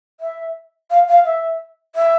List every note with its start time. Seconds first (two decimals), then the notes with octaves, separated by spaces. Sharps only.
0.20 E5
0.91 F5
1.08 F5
1.25 E5
1.96 E5